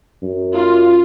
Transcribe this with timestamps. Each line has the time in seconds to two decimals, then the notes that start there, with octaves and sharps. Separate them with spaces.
0.22 F#2
0.55 F4